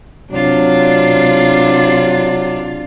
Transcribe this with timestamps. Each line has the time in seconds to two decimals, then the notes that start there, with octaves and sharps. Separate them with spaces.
0.32 C3 F#3 D4 F4